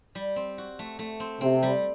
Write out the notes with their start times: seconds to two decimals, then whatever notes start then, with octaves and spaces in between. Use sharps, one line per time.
0.15 G3
0.36 C4
0.58 F#4
0.79 A3
0.99 A3
1.20 C4
1.41 C3 C4
1.63 G3